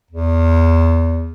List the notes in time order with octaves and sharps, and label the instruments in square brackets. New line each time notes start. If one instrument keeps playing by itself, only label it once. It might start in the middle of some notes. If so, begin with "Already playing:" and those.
[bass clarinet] E2